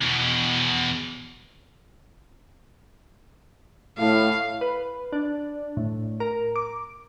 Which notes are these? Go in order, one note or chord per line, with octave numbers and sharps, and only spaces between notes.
E2 B2
A2 F5
B4
D4
A2
A#4
D6